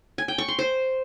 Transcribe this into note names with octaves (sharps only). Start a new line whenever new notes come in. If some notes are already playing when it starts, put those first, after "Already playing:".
G#5
G5
C#6
C6
C5